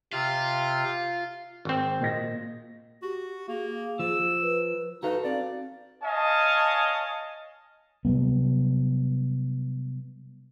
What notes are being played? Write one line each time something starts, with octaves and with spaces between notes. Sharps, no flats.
C3 F4 F5
G#1 C4
A#2 D#5 A#6
F#4 G4
A#3 G#4
F3 E6
B4
D#4 F#4 A4 B4 F5
C4 D5
C#5 D#5 F5 G#5 A5
C3 F#3 G3 B3